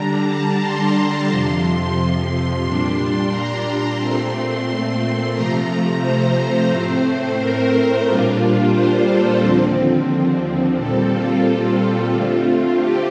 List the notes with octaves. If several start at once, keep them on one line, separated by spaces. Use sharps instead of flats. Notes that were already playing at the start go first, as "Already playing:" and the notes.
Already playing: D3 G3 D4 A#5
A5
C6
F2 C3 F3
C6
A#2 G3 D4
A#5
A#2 A3 C4 C6
C3 F3 A3 A#5
C5
A2 A3 C4
A#4
A#2 G3 A#3 D4 F4
C5
A4
D#2 D3 F3 C4
A#2 G3 C4 A4
F4
D3 A3 C4
G4